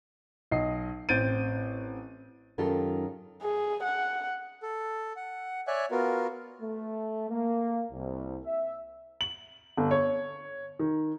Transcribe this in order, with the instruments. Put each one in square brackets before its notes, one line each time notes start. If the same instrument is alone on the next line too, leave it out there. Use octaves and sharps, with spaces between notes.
[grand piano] B1 D#5 C7
A1 C4 G6 A6 D7 D#7
[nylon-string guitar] F#2 D#3 C#4 F4 G4 A4
[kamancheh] G#4
F#5
[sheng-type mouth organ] A4
F#5
C#5 D5 E5 G#5 F#6
B3 F4 F#4 A#4
[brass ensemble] A3
A#3
C2
E5
[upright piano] F#7
G1
C#5
D#3